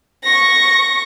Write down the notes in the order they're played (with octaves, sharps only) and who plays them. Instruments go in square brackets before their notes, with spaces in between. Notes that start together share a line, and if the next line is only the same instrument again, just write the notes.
[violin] C#6 A#6